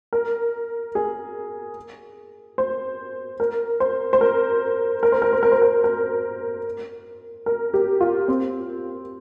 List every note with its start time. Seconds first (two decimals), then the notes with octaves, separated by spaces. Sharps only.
0.13 A#4
0.95 G#4
2.58 C5
3.40 A#4
3.80 C5
4.13 C5
4.21 A#4
5.03 A#4
5.12 C5
5.22 A#4
5.33 C5
5.43 A#4
5.52 C5
5.62 A#4
5.84 A#4
7.46 A#4
7.74 G4
8.01 F4
8.28 C4